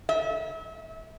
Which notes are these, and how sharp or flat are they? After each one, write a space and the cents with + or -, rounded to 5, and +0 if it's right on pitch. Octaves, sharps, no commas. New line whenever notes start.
E5 -35